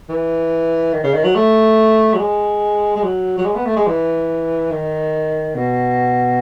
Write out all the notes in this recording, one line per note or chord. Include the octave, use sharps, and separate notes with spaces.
E3
D#3
C#3
D#3
F#3
A3
F#3
G#3
G#3
F#3
F#3
G#3
B3
A3
G#3
E3
D#3
B2